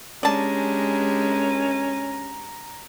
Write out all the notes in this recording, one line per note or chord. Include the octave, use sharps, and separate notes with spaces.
G#3 C#4 D4 G4 D5 A5 A#5